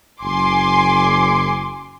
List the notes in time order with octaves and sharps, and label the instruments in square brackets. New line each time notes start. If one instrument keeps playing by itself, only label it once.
[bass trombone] F#1 [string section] G#5 C6 D6